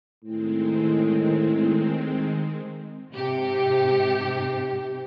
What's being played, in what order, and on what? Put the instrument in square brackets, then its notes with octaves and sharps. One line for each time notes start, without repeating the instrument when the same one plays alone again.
[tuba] A2 [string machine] D#3 G#3 C4
[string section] G#2 C3 G4